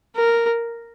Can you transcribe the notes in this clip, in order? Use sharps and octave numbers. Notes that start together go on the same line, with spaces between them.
A#4